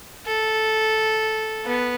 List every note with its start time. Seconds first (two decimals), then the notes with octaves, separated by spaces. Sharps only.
0.27 A4
1.65 B3